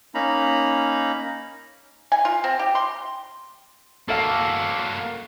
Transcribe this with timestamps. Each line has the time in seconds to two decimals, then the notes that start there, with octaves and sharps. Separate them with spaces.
0.15 A#3 C#4 D#4 A#5 B5
2.12 G#5
2.25 F4
2.44 C4
2.59 G4
2.75 C6
4.09 A#3 F#4 A4 F5